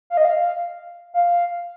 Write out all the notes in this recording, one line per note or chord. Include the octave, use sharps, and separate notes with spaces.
F5
D#5
F5
F5